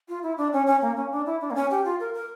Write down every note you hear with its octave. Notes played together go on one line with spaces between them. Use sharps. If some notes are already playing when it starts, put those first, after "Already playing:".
F4
E4
D4
C#4
C#4
A#3
C#4
D4
E4
D4
A#3
C#4
G4
F4
A#4
A#4